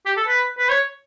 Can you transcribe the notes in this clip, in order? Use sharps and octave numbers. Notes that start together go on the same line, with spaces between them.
G4
A4
B4
B4
C#5